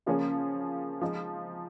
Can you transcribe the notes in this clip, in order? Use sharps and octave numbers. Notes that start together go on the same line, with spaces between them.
C#3 F3 A#3 C#4 G#4
F3 G#3 D#4